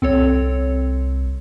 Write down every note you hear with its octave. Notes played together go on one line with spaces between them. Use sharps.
C2 C4 A4 C#5